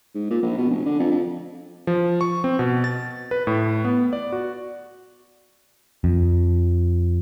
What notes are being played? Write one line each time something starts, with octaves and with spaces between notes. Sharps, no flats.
G#2
A#2
A#1
B2
F1
D3
F2
F2
F3
C#6
C4
B2
A6
B4
A2
B3
D5
F#4
F2